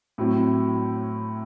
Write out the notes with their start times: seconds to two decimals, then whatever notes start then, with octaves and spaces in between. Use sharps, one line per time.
0.18 A2 F#3 C4 E4